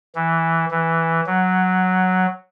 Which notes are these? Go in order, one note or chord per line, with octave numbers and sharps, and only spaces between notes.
E3
E3
F#3